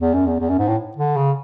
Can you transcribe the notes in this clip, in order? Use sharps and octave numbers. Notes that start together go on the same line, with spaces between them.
E2
F#2
E2
E2
F#2
G#2
A2
D3
C#3